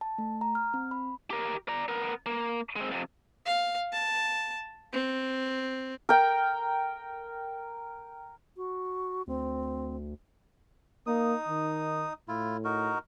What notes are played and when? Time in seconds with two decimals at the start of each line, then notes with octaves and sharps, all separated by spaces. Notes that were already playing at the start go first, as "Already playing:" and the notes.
0.01 A5
0.18 A3
0.41 A#5
0.55 F6
0.74 C4
0.91 B5
1.31 G4 A#4
1.68 D5 A#5
1.88 B3 A#4
2.26 A#3
2.76 G#3 C4
2.91 F2 C3
3.46 F5
3.92 A5
4.93 C4
6.09 A#4 G5
8.57 F#4
9.27 D2 C4
11.07 A#3 D#4 D#6
11.48 D#3
12.28 A2 E4 F4
12.65 D#4 F#4 A#4